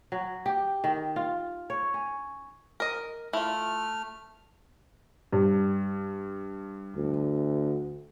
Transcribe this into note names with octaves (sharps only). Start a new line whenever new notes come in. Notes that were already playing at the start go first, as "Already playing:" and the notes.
F#3
G4
D#3
F4
C#5
C#4
A#4 D#5
A3 E4 F4 F6
G2
D2